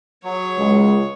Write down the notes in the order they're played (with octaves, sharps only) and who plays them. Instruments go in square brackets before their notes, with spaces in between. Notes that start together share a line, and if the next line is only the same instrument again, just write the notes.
[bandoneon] F#3 [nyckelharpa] G#4 C#5
[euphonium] C#2 [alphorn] G#3